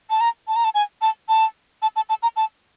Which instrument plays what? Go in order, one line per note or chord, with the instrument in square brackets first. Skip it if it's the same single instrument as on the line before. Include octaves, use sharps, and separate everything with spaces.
[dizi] A5
A#5
A5
A#5
A5
G#5
A5
A5
A5
A5
A5
A#5
A5